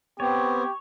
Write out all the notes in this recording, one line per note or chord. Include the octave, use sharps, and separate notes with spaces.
B3 C4 G4 C#5